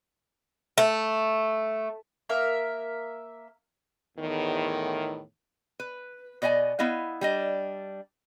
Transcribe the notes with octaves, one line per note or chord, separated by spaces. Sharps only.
A3
A#3 A#4 E5
E2 A2 D#3
B4
B2 D5 D#5 F#5 G#5
B3 E4 D#5 F5
G3 D4 D#5